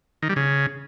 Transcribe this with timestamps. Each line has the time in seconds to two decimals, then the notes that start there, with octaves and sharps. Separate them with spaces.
0.22 D#3
0.29 G3
0.36 C#3